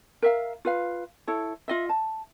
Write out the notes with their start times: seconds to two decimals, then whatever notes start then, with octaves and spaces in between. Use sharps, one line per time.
0.22 A#4 E5 F5
0.65 F4 B4 F5
1.27 E4 A4 C#5
1.68 F4 D#5 E5
1.89 A5